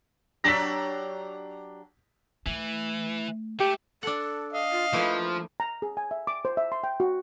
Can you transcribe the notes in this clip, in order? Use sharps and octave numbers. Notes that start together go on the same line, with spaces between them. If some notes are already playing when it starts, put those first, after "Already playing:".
F#3 D4 G4 A#6 B6
E3 A3
A3 G4
D4 A4 F#5
D#5 F5
F4
F3 A3 A#3 E4 B4
A#5
G#4
G#5
E5
D6
C5
E5
C6
G5
F#4